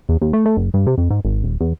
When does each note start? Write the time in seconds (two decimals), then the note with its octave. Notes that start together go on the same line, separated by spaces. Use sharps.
0.09 E2
0.22 D#2
0.33 A3
0.46 A3
0.57 F#1
0.74 G2
0.87 C3
0.98 F2
1.10 G#2
1.25 G#1
1.44 D#1
1.61 E2